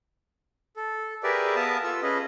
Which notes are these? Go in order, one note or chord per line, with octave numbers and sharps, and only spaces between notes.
A4
G4 G#4 A#4 B4 D5 E5
B3 E5 F5 A5 D#6
F4 A4 E6
C#4 G#4 B4 D#5